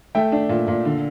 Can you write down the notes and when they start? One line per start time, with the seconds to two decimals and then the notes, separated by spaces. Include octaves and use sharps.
0.15 A3 E5 G5
0.32 D4
0.49 A#2
0.68 A#2
0.85 D3